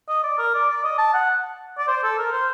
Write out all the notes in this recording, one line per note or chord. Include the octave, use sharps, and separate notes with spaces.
D#5
D5
A#4
D5
D5
D#5
A5
F#5
D5
C5
A4
A#4
C5